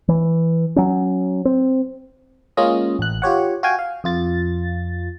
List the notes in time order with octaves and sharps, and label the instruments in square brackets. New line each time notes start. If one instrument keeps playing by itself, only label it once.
[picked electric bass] E3
F#3 C#4
C4
[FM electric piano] G#3 A#3 C#4 F4 D#5
A1 F#6
F4 G4 C#5 F#5
F#4 F5 G5 G#5
F5
F2 F4 A6